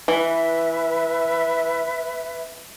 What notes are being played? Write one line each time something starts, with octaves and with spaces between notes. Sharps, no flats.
E3 B4 E5